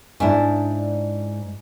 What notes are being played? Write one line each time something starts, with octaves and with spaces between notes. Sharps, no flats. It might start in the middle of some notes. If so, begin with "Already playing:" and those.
G#2 C#4 D4 E4